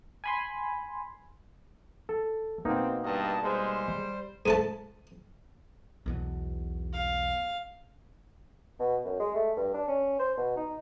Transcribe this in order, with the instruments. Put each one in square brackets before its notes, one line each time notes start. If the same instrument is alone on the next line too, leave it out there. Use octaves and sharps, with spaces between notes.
[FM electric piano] G#5 B5 C6
[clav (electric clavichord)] A4
[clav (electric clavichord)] B2 A#3 D#4 [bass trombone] C4
[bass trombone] G2 [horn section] D#5 A5
[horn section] G3 C5 [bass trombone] G#3
[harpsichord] G#2 A3 A5
[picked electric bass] B1 E2 B2
[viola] F5
[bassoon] B2
F#2
G#3
A3
G2
D4
C#4
C5
B2
D#4